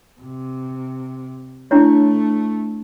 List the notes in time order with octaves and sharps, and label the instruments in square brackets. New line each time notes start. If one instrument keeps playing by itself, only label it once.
[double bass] C3
[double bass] A3 [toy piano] D4 E4 C#5